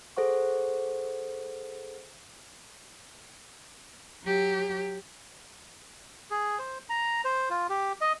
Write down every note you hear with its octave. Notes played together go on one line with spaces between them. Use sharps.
G#4 A4 C5 F#5 C#6
F#3 G4
G#4
C5
A#5
C5
F4
G4
D#5